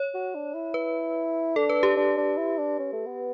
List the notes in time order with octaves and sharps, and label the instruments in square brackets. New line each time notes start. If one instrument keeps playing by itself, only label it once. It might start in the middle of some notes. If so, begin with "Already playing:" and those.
Already playing: [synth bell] C#5
[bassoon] F#4
D4
E4
[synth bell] B4
[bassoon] D4 [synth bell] A4
[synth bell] B4
G4
[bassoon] D4
D4
E4
D4
C#4
A3
B3